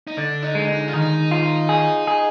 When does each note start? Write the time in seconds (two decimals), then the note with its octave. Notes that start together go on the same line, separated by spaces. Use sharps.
0.07 D#4
0.17 D3 D4
0.43 D#4
0.55 G#3
0.68 D#4
0.88 F4
0.93 D#3 D#4
1.31 F4
1.69 G#4
2.07 G#4